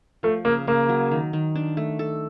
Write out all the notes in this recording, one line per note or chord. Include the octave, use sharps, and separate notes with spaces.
F3 A3
C#3 A#3
C#3 A#3
F#3
D#3
D#3
D4
A3
A4